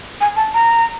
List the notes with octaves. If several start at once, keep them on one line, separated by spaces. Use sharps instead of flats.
G#5
A5
A#5